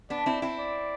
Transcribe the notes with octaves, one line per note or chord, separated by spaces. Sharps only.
B3 D4 D5
C4 E4
C4 E4
D5